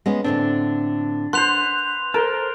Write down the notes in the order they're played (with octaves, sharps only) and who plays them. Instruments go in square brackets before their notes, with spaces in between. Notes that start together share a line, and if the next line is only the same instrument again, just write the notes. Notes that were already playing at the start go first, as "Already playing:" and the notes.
[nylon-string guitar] G#3 B3 C#4
[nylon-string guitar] A2 D3 C4 [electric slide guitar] D4
[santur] B4 C5 [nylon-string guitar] F#5 [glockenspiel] C6 F#6 F7
[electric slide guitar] A4 C5 [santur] A#4